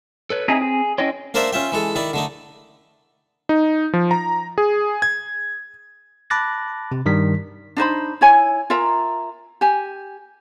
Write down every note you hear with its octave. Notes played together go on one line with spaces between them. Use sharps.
A4 B4 C#5
C4 D#4 E4 G#4
G#4
C#4 E4 C#5 D#5 G5 C6
A#3 D4 A#4 C5 D5 E5
C#4 F4 E5 G5
E3 G#3 A4
D#3 E4 D5
D3 A3 D#4
D#4
F3
A#5
G#4
G#6
A5 B5 D6 F#6 A6 A#6
C3
G2 D#3 G3 B6
D4 D#4 C5 B5
E4 C#5 G#5
F4 A#4 E5 A#5
G4 G#5